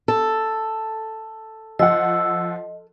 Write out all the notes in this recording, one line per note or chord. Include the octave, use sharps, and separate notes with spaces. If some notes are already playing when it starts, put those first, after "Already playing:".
A4
F3 D#5 F#5 E6